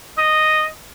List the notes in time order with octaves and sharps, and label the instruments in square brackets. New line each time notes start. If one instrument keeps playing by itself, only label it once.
[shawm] D#5